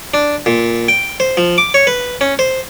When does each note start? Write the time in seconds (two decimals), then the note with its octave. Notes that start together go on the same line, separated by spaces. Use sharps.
0.14 D4
0.46 A#2
0.88 G5
1.20 C5
1.37 F3
1.58 D6
1.74 C#5
1.87 B4
2.21 C#4
2.39 C5